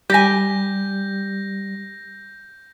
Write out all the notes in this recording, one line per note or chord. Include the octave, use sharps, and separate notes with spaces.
G3 G4 G#5 G6 A#6